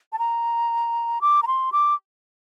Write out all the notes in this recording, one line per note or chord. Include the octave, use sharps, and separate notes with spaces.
A5
A#5
D6
A#5
C6
D6